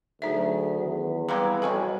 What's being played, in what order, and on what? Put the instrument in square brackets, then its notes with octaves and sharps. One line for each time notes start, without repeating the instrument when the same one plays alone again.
[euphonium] D2 [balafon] F#3 D#4 E5 [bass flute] G#4
[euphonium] E2 [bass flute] D#3
[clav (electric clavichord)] C3 E3 G#3 [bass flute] G3 [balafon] B4 F5 A#5
[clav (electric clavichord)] B1 F2 [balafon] A4 G#5 C#6